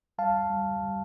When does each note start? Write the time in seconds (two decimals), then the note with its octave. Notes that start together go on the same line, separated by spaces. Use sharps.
0.18 G3 F5 A5
0.50 G3
0.82 G3